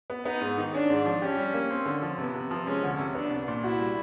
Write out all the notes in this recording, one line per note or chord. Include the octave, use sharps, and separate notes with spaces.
B3
B3 D#4
G#2
D#3
C#4 D4
G#2
F3
C#4 G4
G3
A#3
C4
D3
F3
C3 B3
C3
F3
G#3 C#4
D2
C3
B3 D4
C2
A#2
E4 F#4
G3